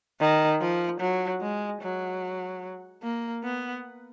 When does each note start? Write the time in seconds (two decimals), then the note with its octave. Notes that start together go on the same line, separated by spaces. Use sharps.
0.20 D#3
0.61 F3
1.00 F#3
1.41 G#3
1.81 F#3
3.03 A#3
3.43 B3